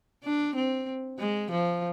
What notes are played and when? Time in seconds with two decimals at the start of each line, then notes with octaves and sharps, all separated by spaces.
0.24 D4
0.55 C4
1.19 G#3
1.51 F3